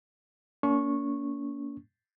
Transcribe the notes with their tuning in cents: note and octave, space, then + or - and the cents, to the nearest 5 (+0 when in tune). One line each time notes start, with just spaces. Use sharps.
A#3 +0 C#4 +45 C#6 -10